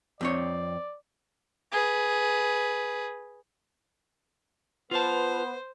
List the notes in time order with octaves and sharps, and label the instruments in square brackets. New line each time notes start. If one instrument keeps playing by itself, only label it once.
[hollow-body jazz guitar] F2 C4 C#5 [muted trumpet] D5
[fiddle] G#4 B4
[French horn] B3 [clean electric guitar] F4 A5 [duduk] B4 [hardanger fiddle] C5